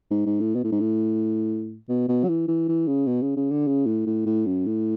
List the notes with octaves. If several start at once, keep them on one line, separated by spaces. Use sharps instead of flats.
G#2
G#2
A2
B2
A2
G#2
A2
B2
B2
F#3
E3
E3
E3
C#3
B2
C#3
C#3
D3
C#3
A2
A2
A2
F#2
A2